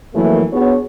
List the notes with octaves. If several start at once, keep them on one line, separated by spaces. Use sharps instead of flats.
F2 E3 F#3 A3 A#3
B3 D4 F#4 G#4 C#5